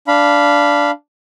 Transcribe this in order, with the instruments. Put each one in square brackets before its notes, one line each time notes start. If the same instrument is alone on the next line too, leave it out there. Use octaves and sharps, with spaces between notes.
[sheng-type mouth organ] D4 F5 B5